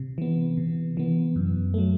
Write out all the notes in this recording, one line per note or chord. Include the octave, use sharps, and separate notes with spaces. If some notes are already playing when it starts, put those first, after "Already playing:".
Already playing: C3
E3 B3
C3
E3 B3
F#2
F#3 A3